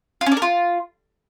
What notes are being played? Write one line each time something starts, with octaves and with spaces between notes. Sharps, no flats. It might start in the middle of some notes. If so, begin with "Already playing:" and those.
F4
C#4
D4
A#4
F4